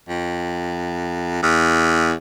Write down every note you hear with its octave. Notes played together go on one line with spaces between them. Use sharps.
F2
E2